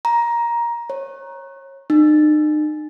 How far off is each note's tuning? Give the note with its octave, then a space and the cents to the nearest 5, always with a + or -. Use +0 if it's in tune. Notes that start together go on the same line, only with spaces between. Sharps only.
A#5 +15
C#5 -25
D#4 -45